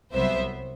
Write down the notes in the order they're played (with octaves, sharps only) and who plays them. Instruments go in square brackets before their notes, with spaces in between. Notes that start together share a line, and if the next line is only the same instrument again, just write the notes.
[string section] C2 C3 F#3 B3 C5 E5